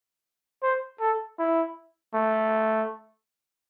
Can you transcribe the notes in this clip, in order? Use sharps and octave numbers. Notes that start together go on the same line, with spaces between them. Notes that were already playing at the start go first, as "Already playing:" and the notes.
C5
A4
E4
A3